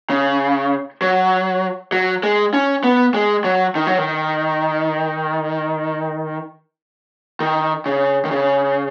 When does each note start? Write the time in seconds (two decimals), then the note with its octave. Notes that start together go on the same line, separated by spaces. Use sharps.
0.10 C#3
1.02 F#3
1.92 F#3
2.23 G#3
2.54 C#4
2.84 B3
3.14 G#3
3.44 F#3
3.75 D#3
3.87 F#3
3.98 D#3
7.40 D#3
7.86 C#3
8.25 D#3
8.31 C#3